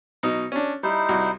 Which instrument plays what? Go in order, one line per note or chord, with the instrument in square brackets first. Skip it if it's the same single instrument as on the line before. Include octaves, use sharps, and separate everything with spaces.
[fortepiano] B2 F#3 D#4
C#4 D4
[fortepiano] G3 [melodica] D#4 E4 C5
[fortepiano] C2 F#4